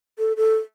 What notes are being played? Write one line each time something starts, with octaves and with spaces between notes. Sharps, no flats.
A4
A4